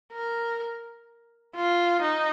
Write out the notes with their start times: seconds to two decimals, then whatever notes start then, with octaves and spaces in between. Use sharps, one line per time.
0.13 A#4
1.55 F4
2.02 D#4